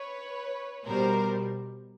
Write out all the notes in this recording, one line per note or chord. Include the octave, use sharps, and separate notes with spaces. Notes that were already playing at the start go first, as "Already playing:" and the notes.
Already playing: B4 C#5
B2 G3 A#4 C5